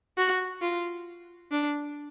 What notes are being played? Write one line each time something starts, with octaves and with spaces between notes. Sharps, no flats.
F#4
F4
D4